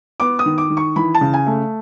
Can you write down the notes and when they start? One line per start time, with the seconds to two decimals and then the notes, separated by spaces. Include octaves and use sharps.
0.20 B3 D6
0.39 D#6
0.46 D#3
0.58 D6
0.70 D#3
0.77 C#6
0.96 E3 B5
1.14 A5
1.21 C#3
1.33 G#5
1.47 A3